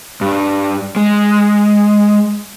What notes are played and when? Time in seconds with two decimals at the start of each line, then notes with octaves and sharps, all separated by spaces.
0.21 G2
0.96 G#3